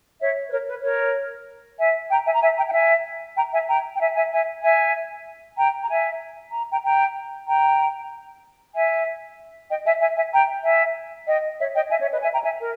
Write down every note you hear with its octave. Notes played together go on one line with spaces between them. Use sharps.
C#5 E5
B4
A#4 C#5
B4
A#4 C#5
E5 G#5
G5 A#5
E5 G#5
A#5
E5 G#5
G5 A#5
G5
E5 G#5
G5 A#5
E5 G#5
G5 A#5
G5
E5 G#5
E5 G#5
E5 G#5
E5 G#5
G5 A#5
A#5
E5 G#5
A#5
G5 A#5
G5 A#5
G5 A#5
E5 G#5
D#5 G5
E5 G#5
E5 G#5
E5 G#5
G5 A#5
E5 G#5
D#5 G5
C#5 E5
D#5 G5
E5 G#5
C#5 E5
B4 D#5
E5 G#5
G5 A#5
E5 G#5
A#4